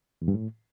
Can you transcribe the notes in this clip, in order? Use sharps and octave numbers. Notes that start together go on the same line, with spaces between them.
E2
G2
A2